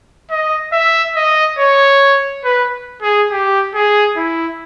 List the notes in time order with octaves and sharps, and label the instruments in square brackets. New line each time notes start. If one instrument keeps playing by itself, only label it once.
[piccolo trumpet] D#5
E5
D#5
C#5
B4
G#4
G4
G#4
E4